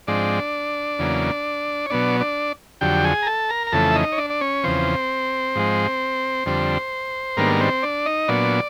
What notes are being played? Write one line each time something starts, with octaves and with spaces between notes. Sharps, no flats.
G#2 F3 G#3 C4 D4 D5
E2 C#3 F#3 A#3
C#5
B2 F#3 B3 D4 D5
D4 D5
F2 D3 F#3 G4 G5
G#4 G#5
A#5
A4 A5
A#4 A#5
A#5
F2 C#3 E3 A3 A4 A5
E5
D#4 D#5
C#5
D4 D5
D5
C#4 C#5
E2 C#3 F3 C4 C5
G#2 F3 G#3
F2 D3 G3 C4
G#2 D#3 G3 A#3 B3 D4 A#4
C4 C5
D4 D5
D#4 D#5
A#2 F#3 B3 D4 D5